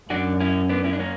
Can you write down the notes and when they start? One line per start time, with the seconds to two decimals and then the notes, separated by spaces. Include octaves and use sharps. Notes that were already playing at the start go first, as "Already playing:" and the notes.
0.10 F#2 D4 F#4
0.40 C#4 E4
0.69 B3 D4
0.84 C#4 E4
0.93 D4
0.99 A#3 C#4